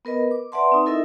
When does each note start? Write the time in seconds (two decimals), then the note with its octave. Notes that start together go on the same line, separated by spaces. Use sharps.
0.05 B3 A#4 B4 D#5
0.31 D6
0.52 B4 D5 E5 F#5 A5 C6
0.72 C4 D#4
0.86 D#4 E4 A4 A#4 D#5 E5